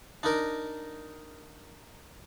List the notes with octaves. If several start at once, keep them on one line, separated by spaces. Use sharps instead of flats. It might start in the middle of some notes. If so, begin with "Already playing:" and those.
D4 D#4 A#4